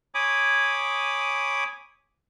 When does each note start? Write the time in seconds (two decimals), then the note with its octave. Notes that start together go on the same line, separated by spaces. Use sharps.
0.15 C#5 G#5 B5 D6 D#6